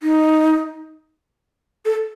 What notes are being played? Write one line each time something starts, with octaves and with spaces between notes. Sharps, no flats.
D#4
A4